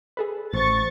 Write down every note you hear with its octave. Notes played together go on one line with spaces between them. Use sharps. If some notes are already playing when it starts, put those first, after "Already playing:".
G#4 A4 B4
A1 C5 C#6 A6